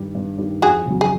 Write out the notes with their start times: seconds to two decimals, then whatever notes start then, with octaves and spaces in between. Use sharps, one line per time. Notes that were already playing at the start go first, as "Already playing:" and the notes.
Already playing: G2 D#3 G3
0.15 G2
0.38 D#3 G3
0.62 F2 F#4 G#4
0.86 C#3 F#3
1.01 G#4